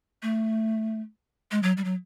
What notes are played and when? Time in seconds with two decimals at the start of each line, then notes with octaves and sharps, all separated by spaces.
0.23 A3
1.52 G#3
1.63 F#3
1.77 G3
1.84 F#3